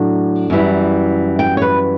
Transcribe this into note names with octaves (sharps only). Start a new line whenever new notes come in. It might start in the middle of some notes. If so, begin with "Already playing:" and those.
Already playing: A2 F#3 D4
F#2 E3 G3
G5
C#5
B4